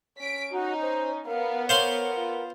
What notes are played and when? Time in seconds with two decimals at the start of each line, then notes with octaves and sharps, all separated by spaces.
0.19 C#4 B6 D7
0.52 D#4 F#4
0.81 C5
1.27 B3 A#4 F5
1.69 A#4 C5 C#5 F5 C6
2.16 F4